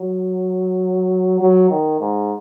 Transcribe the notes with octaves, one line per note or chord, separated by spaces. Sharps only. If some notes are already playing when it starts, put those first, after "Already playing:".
Already playing: F#3
F#3
D#3
G#2